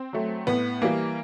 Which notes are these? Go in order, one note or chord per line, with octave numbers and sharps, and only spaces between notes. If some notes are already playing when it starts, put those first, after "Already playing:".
Already playing: C4
F#3 A3
A2 B3
E3 G3 A#3